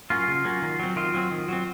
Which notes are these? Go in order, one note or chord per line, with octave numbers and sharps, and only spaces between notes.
F#3 A#3 C#4 F4
C#3
F#3 A#3 C#4
D#3
F#3 C4
D#3 F4
F#3 C4
D#3
F#3 C4